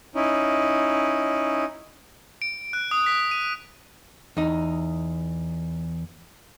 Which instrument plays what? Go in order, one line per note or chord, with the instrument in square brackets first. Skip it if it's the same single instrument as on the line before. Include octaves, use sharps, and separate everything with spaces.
[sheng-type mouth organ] C#4 D#4 E4
[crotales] D7
F#6
D#6
B6
D#7
[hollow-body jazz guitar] E2 D#4